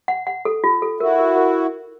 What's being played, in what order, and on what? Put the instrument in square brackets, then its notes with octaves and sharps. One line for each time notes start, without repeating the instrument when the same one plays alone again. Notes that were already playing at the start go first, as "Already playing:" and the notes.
[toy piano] F#5
F#5
A4
F4
A4
[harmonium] E4 F#4 [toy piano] A#4
[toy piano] A#4
A#4